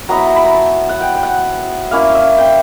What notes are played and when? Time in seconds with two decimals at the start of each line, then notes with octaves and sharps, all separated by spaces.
0.09 F#3 B3 E4 A#5
0.18 B5
0.27 A#5
0.36 B5
0.44 A#5
0.54 A5
0.89 F#5
1.01 G5
1.15 G5
1.23 F#5
1.91 A#3 C#4 E4 F5
2.15 E5
2.38 G5